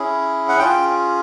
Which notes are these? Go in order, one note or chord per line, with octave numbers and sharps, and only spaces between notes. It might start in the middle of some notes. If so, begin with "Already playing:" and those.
Already playing: C#4 E4 G#4
F#5
C#4 F4 G#4 G5